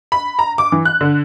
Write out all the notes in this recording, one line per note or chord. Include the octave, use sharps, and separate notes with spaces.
B5
A#5
D6
E3
F#6
D3